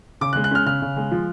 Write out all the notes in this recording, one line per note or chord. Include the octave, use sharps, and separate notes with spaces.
C#3 D6
F#6
G#3
F#6
C#4 F6
C#3 F6
C#3
G#3
F3